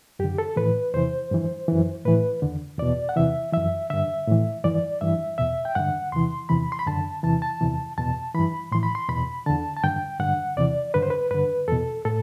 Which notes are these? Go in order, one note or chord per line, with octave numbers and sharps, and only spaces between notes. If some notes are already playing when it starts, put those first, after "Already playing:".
F#2 D3 G4
A4
A2 E3 B4
E2 C3 E3 C5
G2 E3
F#2 E3
A2 E3 B4
E2 D3
E2 B2 D5
F#5
E2 C3 E3 E5
F#2 E3 E5
G2 D3 E5
A2 E3
G2 E3 D5
G2 E3 E5
E2 B2 E5
G5
G2 D3 F#5
E2 C3 E3 C6
E2 C3 E3 B5
C6
B5
F#2 D3 A5
E2 C3 E3 A5
A5
E2 C3 E3
E2 B2 A5
G2 E3 B5
A2 E3 C6
B5
C6
E2 B2 B5
E2 D3 A5
A5
G2 D3 G5
G2 D3 F#5
E2 C3 E3 D5
G2 D3 B4
C5
B4
G2 D3 B4
E2 B2 A4
A2 A4